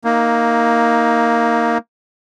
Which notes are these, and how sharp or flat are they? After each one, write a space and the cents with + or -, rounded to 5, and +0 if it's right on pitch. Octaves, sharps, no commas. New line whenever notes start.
A#3 +0 D#4 +10